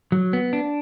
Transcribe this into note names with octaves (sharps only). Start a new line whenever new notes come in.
F#3
B3
D4